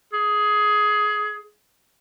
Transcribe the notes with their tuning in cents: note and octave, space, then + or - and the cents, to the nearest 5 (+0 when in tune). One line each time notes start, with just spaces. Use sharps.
G#4 +15